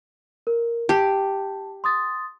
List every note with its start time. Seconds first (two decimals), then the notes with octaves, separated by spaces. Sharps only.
0.47 A#4
0.89 G4 A5
1.84 C6 D#6 A6